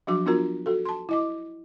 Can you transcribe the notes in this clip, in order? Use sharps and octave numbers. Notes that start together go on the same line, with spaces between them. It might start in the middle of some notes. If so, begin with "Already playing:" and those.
F3 F#3 D4 F#4 D6
B3 D4 F4 F#4 A#4 A#5
F#4 A4
A5 C6
E4 D#5 D6